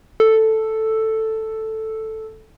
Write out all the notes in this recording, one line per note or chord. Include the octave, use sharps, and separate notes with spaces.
A4